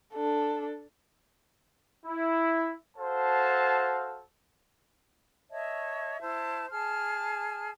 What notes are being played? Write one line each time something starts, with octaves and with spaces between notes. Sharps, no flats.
D4 A4
E4
F#4 A4 C5 F5 A5
C#5 D#5 E5 A5
E4 C5 A5
G#4 A5 F6